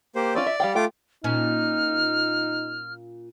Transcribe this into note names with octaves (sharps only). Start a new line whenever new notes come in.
A#3 G4 C5
C4 C#4 F4 D5
E5
G3 F5 G5
A3 F4 G5 D6
A#2 C#4 D#4 F6